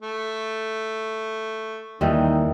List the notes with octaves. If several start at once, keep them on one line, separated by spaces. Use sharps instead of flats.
A3
D#2 D#3 E3 G3 D#4